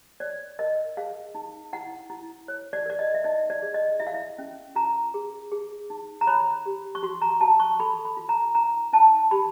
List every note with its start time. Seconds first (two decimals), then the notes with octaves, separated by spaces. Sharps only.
0.20 C#5 D5
0.59 A#4 D#5
0.97 G#4 F5
1.35 D#4
1.73 E4 F#5
2.10 E4
2.48 C#5
2.73 D5
2.86 A#4 D5
2.99 D#5
3.14 E5
3.24 D#4 D#5
3.50 D5
3.62 G#4
3.74 D#5
4.00 E4 E5
4.07 F5
4.14 E5
4.38 C#4
4.76 F4 A#5
5.14 G#4
5.52 G#4
5.90 D#4
6.21 A#5
6.27 C#5 B5
6.66 G4
6.95 C#6
7.03 F#4 C6
7.22 A#5
7.41 F#4 A5
7.60 C#6
7.80 A4 B5
8.05 B5
8.17 F4
8.29 A#5
8.55 D#4 A#5
8.93 D#4 A5
9.31 G4 B5